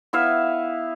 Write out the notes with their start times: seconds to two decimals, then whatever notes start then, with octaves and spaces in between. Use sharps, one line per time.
0.13 B3 E4 E5 F5